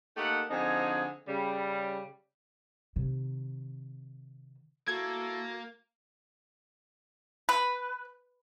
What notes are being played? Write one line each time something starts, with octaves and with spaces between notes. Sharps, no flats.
A3 A#3 D#4 G4 A4 F#5
D3 F3 C4 D#4 G#4 G#5
C#3 G3
C3 D#3
A#3 E4 F#4 A4 G#6
B4